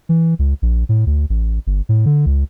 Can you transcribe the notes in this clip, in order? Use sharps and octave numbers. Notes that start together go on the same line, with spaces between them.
E3
C#2
A#1
A2
D2
A1
G1
A2
D3
C#2